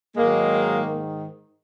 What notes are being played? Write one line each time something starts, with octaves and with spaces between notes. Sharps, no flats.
G#2 D#3 F#3 G#3 A#3